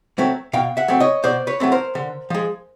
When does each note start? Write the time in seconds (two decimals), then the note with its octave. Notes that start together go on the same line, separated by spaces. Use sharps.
0.18 F#3 A3 C4
0.53 B2 F5 G5
0.77 E5 F#5
0.88 F#3 A3 C4
1.00 C#5 D#5
1.24 B2 C5 D5
1.47 B4 C#5
1.60 F#3 A3 C4
1.72 A#4 C5
1.95 D3
2.30 F3 G#3